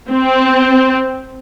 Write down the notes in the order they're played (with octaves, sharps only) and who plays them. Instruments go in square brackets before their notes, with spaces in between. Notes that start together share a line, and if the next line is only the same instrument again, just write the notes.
[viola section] C4